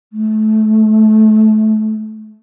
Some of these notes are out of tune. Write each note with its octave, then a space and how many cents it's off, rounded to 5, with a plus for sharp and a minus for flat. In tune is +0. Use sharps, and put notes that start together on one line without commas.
A3 -25